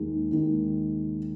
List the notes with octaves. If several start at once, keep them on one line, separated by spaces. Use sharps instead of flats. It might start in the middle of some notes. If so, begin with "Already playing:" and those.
Already playing: D#2 D#3 G#3
D#2 D#3 G#3